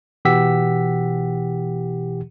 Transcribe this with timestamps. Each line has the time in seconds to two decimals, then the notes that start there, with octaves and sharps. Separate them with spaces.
0.25 B2 E3 G4 F#5 E6 B6